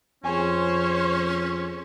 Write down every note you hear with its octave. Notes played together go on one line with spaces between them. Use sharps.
F2 C#4 G#4 C5 C#5 G#5